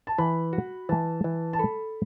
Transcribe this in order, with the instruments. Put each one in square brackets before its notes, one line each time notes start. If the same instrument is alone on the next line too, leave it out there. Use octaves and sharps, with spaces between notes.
[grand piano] A5
[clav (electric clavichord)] E3 [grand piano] B5
[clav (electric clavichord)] F#4
[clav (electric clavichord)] E3 [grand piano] A5
[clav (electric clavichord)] E3
[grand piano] A5
[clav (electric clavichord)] A4 [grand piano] B5